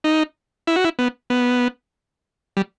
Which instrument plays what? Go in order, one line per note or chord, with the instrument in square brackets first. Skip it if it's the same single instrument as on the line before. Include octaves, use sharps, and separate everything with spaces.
[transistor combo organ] D#4
E4
F#4
E4
B3
B3
G3